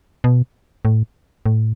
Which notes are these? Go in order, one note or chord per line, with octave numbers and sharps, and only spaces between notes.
B2
A2
A2